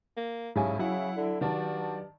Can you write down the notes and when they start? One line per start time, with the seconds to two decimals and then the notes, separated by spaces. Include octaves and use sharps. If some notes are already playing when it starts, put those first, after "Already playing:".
0.17 A#3
0.56 B1 G#2 C#3 E4 G4 G#5
0.79 C#3 F#3 E4 F#5
1.16 D3
1.41 G2 D#3 F#4 D5 A5